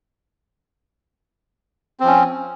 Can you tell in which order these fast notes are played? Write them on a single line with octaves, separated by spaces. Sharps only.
C4 F3 C#4